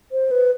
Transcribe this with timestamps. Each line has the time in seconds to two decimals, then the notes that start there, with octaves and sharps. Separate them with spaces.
0.12 C5
0.31 B4